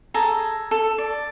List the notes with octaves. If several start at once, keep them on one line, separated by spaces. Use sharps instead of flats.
G#4 A4 A#5
A4
D5